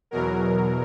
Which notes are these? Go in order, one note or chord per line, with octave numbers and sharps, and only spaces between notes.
E2 B2 F#3 A#4